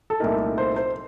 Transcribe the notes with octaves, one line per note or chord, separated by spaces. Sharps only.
A4
C2 A#2 A3 D#4 A#4
C5
C5